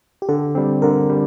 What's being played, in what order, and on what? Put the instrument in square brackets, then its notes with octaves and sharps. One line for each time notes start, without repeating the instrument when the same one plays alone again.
[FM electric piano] G4
[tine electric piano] D3 [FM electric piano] A4
[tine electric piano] G3 C4
[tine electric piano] D3 [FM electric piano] A#4
[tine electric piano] G3